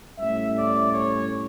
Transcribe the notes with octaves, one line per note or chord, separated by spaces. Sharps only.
A2 G3 C#4 E5
D5
C#5